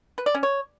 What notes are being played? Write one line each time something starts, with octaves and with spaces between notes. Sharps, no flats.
B4
D5
C#4
C#5